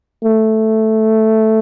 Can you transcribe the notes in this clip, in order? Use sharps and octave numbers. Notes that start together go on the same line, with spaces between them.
A3